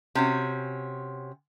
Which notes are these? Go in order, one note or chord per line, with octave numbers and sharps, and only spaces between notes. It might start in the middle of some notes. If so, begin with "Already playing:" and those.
C3 C#4 F#4